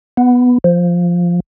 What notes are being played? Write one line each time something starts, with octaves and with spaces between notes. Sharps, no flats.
B3
F3